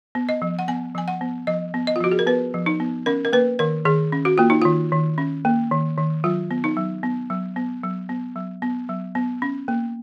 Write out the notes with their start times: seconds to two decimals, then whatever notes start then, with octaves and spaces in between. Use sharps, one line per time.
0.15 B3
0.29 D#5
0.42 F3
0.59 F#5
0.68 B3 G#5
0.95 F3 G#5
1.08 F#5
1.21 B3
1.47 F3 D#5
1.74 B3
1.87 D#5
1.96 F4
2.01 F3 F#4
2.11 G#4
2.19 A#4
2.27 B3 B4
2.54 F3
2.66 D#4
2.80 B3
3.06 C#4 A#4
3.25 A#4
3.33 A#3 B4
3.59 D#3 A#4
3.85 D#3 G#4
4.12 C#4
4.25 F#4
4.38 A#3 F4
4.50 D#4
4.62 D#3 F4
4.92 D#3
5.18 C#4
5.45 A#3
5.71 D#3
5.98 D#3
6.24 F#3 F4
6.51 B3
6.64 D#4
6.77 F#3
7.03 B3
7.30 F#3
7.56 B3
7.83 F#3
8.09 B3
8.36 F#3
8.62 B3
8.89 F#3
9.15 B3
9.42 C#4
9.68 A#3